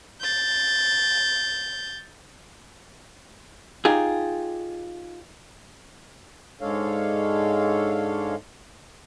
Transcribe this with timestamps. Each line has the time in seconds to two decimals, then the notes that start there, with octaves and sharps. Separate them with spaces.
0.21 G6 A6
3.85 D#4 F4 G4 G#4
6.61 G#2 G#3 D4 A4 C#5 F5